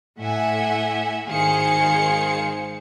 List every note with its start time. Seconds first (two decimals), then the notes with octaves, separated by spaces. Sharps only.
0.18 A2 E5 F#5 G#5
1.27 G#1 D#3 G#4 C5 F5 C#7